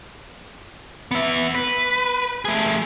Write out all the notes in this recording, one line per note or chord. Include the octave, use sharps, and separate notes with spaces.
B3 E5
B4
A3 G#4